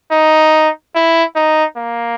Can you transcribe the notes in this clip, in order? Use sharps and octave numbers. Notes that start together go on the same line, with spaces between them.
D#4
E4
D#4
A#3